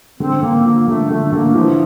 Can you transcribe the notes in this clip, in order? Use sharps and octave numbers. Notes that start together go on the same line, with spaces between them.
D3 C4
D3 A#3
F3 A#3
D3 A3
D3 A3
D3 A#3
E3 F3